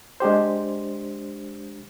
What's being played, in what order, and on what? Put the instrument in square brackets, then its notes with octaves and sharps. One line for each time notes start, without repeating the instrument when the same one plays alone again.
[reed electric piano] G#3 D4 G4 C5